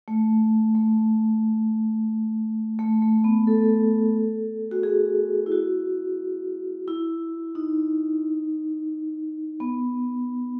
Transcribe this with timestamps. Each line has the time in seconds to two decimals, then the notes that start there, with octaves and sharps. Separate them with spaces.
0.08 A3
0.75 A3
2.79 A3
3.02 A3
3.24 B3
3.47 A4
4.71 F#4
4.83 G#4
5.46 E4
5.52 F#4
6.88 E4
7.55 D#4
9.60 B3